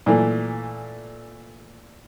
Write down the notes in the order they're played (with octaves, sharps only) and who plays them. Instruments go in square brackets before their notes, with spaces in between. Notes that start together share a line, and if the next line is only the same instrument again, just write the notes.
[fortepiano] A#2 E3 A3